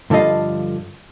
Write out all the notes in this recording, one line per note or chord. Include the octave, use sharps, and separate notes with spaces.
G2 D3 F3 A4 D#5 F5